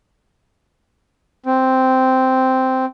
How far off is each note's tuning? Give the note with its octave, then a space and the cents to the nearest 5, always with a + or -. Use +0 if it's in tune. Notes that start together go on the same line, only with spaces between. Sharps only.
C4 -5